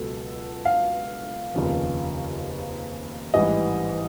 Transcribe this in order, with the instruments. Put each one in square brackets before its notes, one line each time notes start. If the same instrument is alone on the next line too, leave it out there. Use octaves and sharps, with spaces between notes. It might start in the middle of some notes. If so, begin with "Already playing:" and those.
Already playing: [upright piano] C#2 B2 F#3 A4
F5
F1 D#2 C#3 F3
A1 G#2 E3 G3 D#5